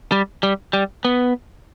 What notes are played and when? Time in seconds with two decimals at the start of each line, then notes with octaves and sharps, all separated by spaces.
0.12 G3
0.43 G3
0.73 G3
1.05 B3